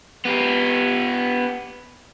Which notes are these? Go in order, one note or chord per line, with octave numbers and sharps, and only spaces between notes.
B3 G4